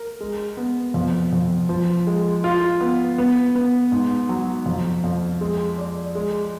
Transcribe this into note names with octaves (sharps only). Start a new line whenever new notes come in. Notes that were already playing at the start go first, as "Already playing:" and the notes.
Already playing: A#4
G#3
B3
F2
F2
F3
G#3
F4
B3
B3
B3
G#2
F#3
F2
F2
G#3
D5
G#3